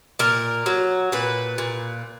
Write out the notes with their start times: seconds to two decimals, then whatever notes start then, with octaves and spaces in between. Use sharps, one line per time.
0.19 A#2 A#4
0.66 F#3
1.12 A#2 B4
1.58 A#2